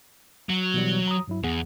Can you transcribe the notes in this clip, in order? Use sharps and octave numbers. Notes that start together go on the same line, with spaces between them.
F#3
B2 E3 G3
A#5 D#6
G2 F#3 E4
E2 B3 G#4 F#5